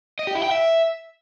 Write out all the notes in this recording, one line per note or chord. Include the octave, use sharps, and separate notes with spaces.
D#5
G4
E4
G5
E5